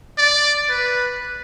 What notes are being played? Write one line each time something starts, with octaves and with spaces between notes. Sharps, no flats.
D5
B4